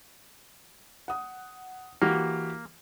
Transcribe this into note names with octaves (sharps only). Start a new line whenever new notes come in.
F#5 D#6
E3 A#3 F#4 G4